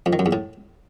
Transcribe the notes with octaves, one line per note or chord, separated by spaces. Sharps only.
F2
D#3
F#2
E2
A2